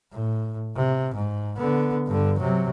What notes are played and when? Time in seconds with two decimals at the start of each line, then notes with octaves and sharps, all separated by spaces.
0.12 A2
0.76 C3
1.15 G#2
1.57 D3 B3
2.07 G2 D3
2.39 C3 F#3